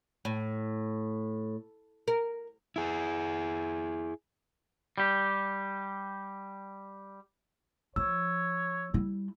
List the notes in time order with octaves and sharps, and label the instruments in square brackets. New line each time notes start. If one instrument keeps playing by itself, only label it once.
[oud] A2
A#4
[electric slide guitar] E4 G#4
[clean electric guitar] G3 G4
[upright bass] F3 [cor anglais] C#5 [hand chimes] E6
[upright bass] G3 E4